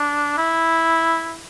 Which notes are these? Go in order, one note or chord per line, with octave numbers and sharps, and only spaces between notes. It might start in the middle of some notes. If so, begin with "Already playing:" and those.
Already playing: D4
E4